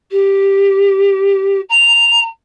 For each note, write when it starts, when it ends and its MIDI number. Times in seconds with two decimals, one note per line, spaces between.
0.11 1.61 67
1.69 2.24 82